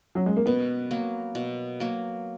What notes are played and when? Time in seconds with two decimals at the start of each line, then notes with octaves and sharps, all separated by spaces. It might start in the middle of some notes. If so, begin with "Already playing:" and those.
0.15 F#3
0.26 G#3
0.36 A#3
0.46 B2 B3
0.91 F#3 A#3
1.35 B2
1.80 F#3 A#3